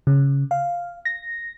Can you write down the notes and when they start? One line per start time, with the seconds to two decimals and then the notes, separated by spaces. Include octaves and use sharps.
0.07 C#3
0.51 F5
1.05 A#6